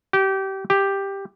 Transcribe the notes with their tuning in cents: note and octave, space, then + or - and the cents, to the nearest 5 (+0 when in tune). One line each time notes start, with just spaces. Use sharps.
G4 -25
G4 +5